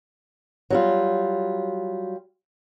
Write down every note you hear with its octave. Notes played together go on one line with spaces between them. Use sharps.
F#3 G3 F4